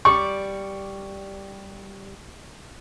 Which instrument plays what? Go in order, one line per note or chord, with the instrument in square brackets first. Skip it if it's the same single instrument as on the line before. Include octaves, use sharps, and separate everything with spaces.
[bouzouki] G3 D5 [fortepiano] C#6